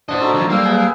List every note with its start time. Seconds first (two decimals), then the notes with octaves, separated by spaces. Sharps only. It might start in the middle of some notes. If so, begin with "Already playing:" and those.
0.09 D4 C5 D5 D#5 F#5
0.21 D#4 F#4 A4 A#5
0.34 D2 F3
0.50 F#3 G3 A#3 F5 G5 E6
0.65 G#4 B4 F#5